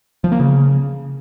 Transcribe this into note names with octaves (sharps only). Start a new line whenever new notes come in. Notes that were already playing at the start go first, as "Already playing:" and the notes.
F3
A#3
C#3